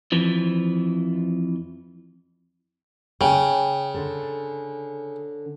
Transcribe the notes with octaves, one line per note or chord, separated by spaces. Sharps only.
F2 E3 F3
C#3 G5
D3 A4